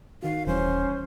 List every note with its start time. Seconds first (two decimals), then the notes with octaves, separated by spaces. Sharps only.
0.23 D#3 F#4 F5
0.47 D#1 E3 G3 C#4 C5